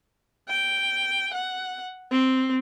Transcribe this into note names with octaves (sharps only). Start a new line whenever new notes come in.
G5
F#5
C4